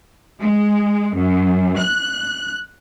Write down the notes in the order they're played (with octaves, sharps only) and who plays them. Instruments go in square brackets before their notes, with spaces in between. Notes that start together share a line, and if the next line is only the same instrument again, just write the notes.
[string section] G#3
F#2
F#6